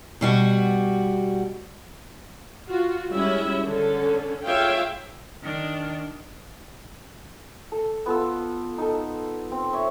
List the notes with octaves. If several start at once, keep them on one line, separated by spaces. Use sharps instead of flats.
B2 G3 F#4
F4 F#4
G3 G#3 C#4 E4 E5
D3 C#4 A4
F4 G#4 C#5 E5 F5 G5
D#3 D4
A4
B3 F4 A4 E6
D#4 A4
C4
C#5 E5